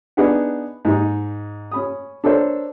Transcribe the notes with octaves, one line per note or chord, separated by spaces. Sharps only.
B3 D4 D#4 G#4 B4 F#5
G#2 D#4
C#4 B5 D#6
D4 A4 A#4 C5 C#5